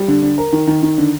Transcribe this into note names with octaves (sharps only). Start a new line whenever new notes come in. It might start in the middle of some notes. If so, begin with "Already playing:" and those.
Already playing: G3
D3
D3
A#4
D#3
D#3
D#3
D3